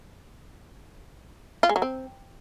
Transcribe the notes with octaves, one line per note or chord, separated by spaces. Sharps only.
F4
G#3
F#3
C4